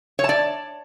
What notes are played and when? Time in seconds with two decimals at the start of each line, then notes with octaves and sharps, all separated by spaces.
0.19 C#5
0.24 A5
0.29 D5